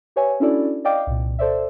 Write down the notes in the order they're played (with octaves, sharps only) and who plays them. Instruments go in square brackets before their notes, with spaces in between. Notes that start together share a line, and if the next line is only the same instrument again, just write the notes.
[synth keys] G4 B4 C#5 E5 G#5
C#4 D4 E4 F#4 A4 D5
D5 D#5 F5 G5 D6
C2 A#2
A4 C5 D5 E5